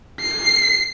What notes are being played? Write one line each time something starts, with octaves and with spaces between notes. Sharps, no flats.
C7